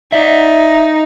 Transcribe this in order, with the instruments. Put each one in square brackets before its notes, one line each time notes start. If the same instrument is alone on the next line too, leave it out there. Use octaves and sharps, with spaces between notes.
[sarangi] D#4 [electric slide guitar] D5 E5